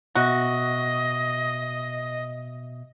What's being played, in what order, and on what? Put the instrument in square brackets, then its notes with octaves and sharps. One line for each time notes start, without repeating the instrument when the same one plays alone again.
[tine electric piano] B2 E5 [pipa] F#4 [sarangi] D#5